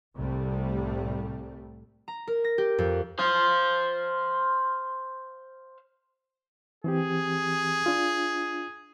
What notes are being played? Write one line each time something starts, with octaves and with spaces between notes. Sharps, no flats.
C2 A2 C3 G3 A3
A#5
A#4
A#6
G4
F2
C5 F5
E3 C4 G4 G#4
D4 F4